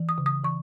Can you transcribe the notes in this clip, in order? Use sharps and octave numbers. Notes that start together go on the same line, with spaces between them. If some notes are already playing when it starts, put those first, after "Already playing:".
Already playing: E3
D#6
C#3
D#6
E3 C#6